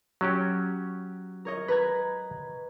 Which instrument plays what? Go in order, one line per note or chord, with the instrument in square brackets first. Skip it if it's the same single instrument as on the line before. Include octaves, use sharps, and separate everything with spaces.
[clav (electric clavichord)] F#3 C#4 G4
[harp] A#4 C#5 D#5
B4 A#5 G#6